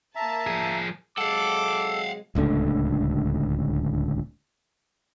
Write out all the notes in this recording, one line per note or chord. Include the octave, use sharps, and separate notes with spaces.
A#3 E5 A5 A#5
F3 G#4
C3 F#3 G#3 A4 F5 F#5 D6
D1 C#2 D3 A3